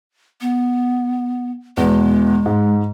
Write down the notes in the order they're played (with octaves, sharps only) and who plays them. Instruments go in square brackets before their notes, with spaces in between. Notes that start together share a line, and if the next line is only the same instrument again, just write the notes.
[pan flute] B3
[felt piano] E2 B2 [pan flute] G#3
[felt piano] G#2